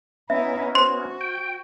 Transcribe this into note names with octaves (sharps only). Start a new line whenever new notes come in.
B3 C#4 D#4 E4 E5
F#4 C5 C6
G5